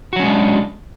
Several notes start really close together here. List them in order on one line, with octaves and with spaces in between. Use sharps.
F#4 F#3 C#4 G#3 D4